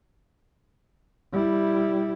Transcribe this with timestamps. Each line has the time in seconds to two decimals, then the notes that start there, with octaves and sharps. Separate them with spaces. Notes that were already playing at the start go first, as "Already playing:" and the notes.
1.33 G3 E4